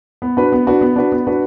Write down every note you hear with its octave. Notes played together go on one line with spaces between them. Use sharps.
B3
D4 F#4 B4
B3
D4 F#4 B4
B3
D4 F#4 B4
B3
D4 F#4 B4